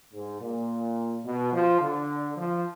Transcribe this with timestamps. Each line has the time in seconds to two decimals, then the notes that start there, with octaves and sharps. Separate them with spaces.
0.13 G#2
0.41 A#2
1.25 B2
1.53 F3
1.81 D3
2.37 F3